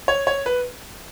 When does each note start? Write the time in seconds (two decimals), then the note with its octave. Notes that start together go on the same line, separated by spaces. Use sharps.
0.08 C#5
0.27 C#5
0.46 B4